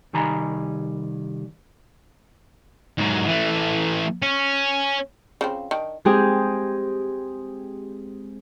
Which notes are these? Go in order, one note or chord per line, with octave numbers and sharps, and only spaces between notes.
C2 D#3 G3 G#5 A#5 B5
G#2 F#3
E3 A3
C#4
C#3 F3 C4
D#3 D4
G#3 C4 G4 G#4